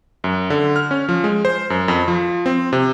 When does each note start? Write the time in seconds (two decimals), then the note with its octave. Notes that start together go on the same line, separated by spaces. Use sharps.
0.24 F#2
0.50 D3
0.76 F6
0.91 C#4
1.09 F3
1.24 G#3
1.45 C5
1.70 F#2
1.88 F2
2.08 F3
2.46 C4
2.73 C3